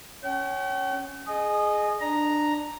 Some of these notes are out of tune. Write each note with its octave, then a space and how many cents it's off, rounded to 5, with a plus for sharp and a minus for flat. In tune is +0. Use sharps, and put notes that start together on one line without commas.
C#4 +0 G5 -45
G#4 +15 D#5 -20
D4 +20 A#5 +0